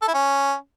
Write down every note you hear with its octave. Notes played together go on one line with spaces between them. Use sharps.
A4
E4
C#4